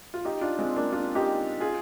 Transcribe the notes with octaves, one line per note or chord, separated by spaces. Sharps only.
F4
D#4 G4
D4 F4
G#3 C4
A#3 D4
D4 F4
D#4 G4
F4 G#4